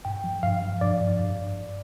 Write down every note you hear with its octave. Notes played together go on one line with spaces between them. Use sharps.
G2 G5
F3
G2 F5
F3
G2 D5
G2
G2